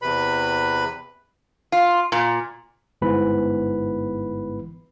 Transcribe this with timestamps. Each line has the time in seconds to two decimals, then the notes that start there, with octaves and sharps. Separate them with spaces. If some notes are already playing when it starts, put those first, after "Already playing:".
0.02 E2 C3 B4 B5
1.72 F4
2.12 A#2
3.02 G1 G#2 E3 B3 B4 B5